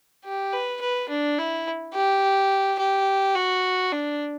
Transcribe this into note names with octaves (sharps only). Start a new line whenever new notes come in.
G4
B4
B4
D4
E4
G4
G4
F#4
D4